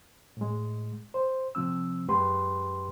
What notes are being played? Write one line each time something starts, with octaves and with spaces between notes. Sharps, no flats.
A2 G#3
C5
C3 F3 C4 E6
F#2 G#3 G4 B4 C6